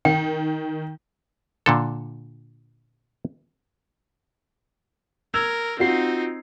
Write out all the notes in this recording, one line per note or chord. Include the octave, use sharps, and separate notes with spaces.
D#3 G5
A#2 D3 A4
A#4 E6 G#6 F7
C4 D#4 F4 F#4 C7